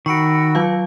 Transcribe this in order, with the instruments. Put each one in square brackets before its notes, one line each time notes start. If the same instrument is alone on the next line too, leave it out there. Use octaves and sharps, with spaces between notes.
[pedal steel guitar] D#3 [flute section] F#4 B5 E6 [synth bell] C#6 C#7 D7
[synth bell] F#3 F4 F5